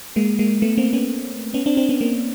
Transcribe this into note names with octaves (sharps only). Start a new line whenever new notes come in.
G#3 A#3
G#3 A#3
A3 B3
A#3 C4
B3 C#4
B3 C#4
C4 D4
C4 D4
B3 C#4
A#3 C4